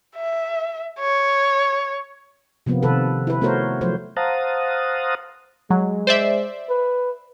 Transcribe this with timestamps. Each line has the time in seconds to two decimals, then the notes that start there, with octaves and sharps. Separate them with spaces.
0.16 E5
1.00 C#5
2.66 C3 F3 A#3 B3
2.83 C3 D#3 A4 B4
3.27 E4 B4
3.41 A3 B3 F#4 A#4 C5 C#5
3.81 F3 F#3 A3 C5
4.17 C5 F5 F#5 A5 A#5 D#6
5.70 F#3 G#3
6.07 C5 D5 E5
6.69 B4